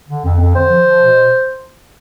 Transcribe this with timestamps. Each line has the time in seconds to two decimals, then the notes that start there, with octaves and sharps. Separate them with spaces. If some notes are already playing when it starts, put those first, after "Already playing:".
0.09 D3
0.25 F2
0.40 F2
0.55 D3 C5
0.70 F3
0.86 F3
1.00 B2